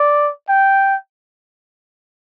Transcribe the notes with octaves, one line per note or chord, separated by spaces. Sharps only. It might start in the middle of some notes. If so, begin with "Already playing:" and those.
Already playing: D5
G5